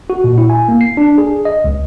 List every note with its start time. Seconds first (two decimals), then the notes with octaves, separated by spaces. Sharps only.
0.10 F#4
0.24 A#2
0.38 E4
0.50 G#5
0.68 A#3
0.81 C7
0.97 D4
1.18 G#4
1.45 D#5
1.64 C#2